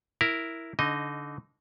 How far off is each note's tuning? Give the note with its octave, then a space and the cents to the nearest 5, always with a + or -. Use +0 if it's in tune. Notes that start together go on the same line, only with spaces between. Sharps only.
E4 +0 A#4 +0
D3 -25 D#4 -20 D#5 +0